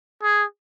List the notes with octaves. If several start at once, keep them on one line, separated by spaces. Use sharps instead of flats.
G#4